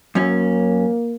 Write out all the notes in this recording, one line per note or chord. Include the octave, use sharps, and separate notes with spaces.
F#2 A#3 C#4